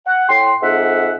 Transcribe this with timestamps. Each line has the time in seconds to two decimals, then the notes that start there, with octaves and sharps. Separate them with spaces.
0.07 F#5
0.29 A2 G5 C6
0.62 F2 G#2 E5 F#5